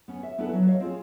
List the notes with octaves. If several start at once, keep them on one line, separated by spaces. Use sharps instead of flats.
B3 C#4
E5
B3 C#4 D4 E4 A4 B4
F#3
C#5 D#5 F5
C4 F4 G#4